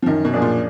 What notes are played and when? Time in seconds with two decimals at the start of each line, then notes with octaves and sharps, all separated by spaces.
0.02 F3
0.06 F#2 D#3
0.25 B2
0.33 F3 A#3 D4 G#4
0.42 A#2